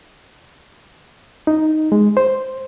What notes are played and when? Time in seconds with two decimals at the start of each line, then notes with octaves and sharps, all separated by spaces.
1.47 D#4
1.92 G#3
2.17 C5